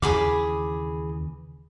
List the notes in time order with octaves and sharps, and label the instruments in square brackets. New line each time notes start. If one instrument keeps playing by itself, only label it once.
[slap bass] D#2 C#3 E3 [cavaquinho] G#4 B5 D6